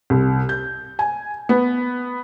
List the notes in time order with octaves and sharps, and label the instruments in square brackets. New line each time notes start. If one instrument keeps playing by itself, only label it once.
[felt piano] C2
G6
G#5
B3